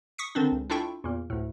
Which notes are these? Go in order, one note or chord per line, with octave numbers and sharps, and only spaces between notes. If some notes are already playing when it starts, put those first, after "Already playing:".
C#6 D#6 B6 C#7
D3 D#3 C4 D4
C#2
D4 E4 F4 A4 G5 C#6
E2 A#2
D2 A2